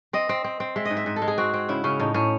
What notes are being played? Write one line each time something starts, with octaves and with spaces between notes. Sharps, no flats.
C4 D#5
C4
C4
C4
G#3 E5
G#2 D#5
E5
G#2 D#5
A4
G#3
G#4
C4 F#4
C4
C#3 E4
C#3 C#4
A2 D#4
A2 C#4